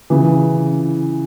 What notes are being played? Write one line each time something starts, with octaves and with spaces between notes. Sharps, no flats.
C#3 E3